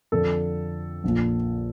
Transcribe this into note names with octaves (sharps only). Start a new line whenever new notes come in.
F2 D3 F3 A4
A#1 A#2 F3